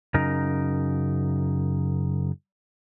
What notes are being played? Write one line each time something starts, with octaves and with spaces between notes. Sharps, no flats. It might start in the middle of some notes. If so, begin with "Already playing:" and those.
F#2 C#3 D#4 A#4